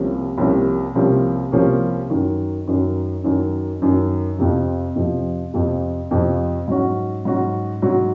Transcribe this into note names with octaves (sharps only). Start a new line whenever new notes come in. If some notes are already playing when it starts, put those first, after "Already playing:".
Already playing: C2 C3 F3 A#3 C#4
C2 C3 F3 A#3 C#4
C2 C3 F3 A#3 C#4
C2 C3 F3 A#3 C#4
F#2 D#3 F#3
F#2 D#3 F#3
F#2 D#3 F#3
F#2 D#3 F#3
F2 C3 F3
F2 C3 F3
F2 C3 F3
F2 C3 F3
G#2 F#3 C#4 F#4
G#2 F#3 C#4 F#4
G#2 F#3 C#4 F#4